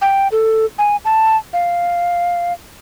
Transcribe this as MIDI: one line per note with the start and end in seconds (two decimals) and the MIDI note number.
0.01 0.28 79
0.32 0.66 69
0.78 0.96 80
1.05 1.37 81
1.53 2.53 77